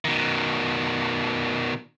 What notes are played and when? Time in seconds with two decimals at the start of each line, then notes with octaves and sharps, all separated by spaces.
0.05 B2 D#3